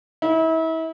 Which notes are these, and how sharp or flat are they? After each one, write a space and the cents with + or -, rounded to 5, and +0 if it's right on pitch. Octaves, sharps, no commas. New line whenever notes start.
E4 -35